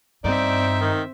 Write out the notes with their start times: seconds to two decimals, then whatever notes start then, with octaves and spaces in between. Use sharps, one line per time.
0.24 G2 C4 D#4 D5 E5
0.81 D#3